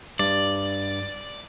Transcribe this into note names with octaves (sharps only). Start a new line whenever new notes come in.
G2 D5